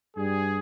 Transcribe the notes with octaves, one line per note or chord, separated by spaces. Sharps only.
G2 G3 G#4